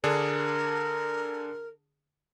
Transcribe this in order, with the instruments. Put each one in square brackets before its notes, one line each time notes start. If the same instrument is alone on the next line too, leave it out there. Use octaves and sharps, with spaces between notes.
[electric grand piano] D3 D4 G#4 [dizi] A#4